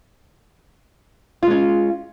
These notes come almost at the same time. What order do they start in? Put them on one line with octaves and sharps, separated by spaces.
F4 G#3 C#4